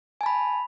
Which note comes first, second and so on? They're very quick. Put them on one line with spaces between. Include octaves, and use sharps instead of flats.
G#5 A5 B5